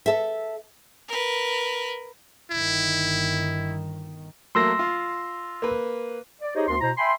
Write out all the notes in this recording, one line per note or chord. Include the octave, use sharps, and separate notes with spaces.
A4 E5
A#4 B4
G1 D#3 E4
F#3 A3 A#3 C6 E6 A#6
F4
A#3 B4
D5
D#4 G4 G#4 C5 C#5 D#5
D2 B3 D4 A#4 C6
B2 E4 C5 A#5
E5 G5 G#5 B5 C6